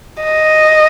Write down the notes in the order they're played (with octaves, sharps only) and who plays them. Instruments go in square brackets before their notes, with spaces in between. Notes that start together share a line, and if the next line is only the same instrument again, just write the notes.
[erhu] D#5